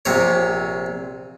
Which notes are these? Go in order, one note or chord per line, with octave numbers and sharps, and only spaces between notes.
A#1 C3 C#5